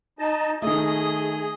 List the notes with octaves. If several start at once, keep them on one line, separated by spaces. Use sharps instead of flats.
D#4 D#5 A5
D#3 A3 G#4 D#5 D#6